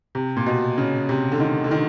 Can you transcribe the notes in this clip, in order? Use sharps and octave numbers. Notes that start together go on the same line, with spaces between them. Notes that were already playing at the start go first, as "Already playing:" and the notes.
C3
A#2
B2
C#3
C3
D3
D#3
D3
D#3